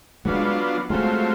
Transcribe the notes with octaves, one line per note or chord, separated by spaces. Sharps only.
F#3 G#3 B3 D4 F4
F#3 G#3 A3 C4 F4